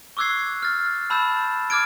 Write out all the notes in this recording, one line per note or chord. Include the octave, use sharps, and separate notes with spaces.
C#6 D6 E6 F#6 G#6 C7
F6 A6
A5 B5 E6 G6 A6 E7
D6 D#6 F6 G#6 A6 D7